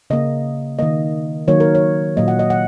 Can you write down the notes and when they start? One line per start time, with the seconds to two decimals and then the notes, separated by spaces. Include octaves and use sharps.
0.10 C#3 A#3 D#5
0.79 D#3 A#3 D#5
1.48 D#3 F#3 A#3 C#5
1.60 A#4
1.75 C#5
2.17 A#2 F#3 A#3 D#5
2.28 F#5
2.39 D#5
2.50 F#5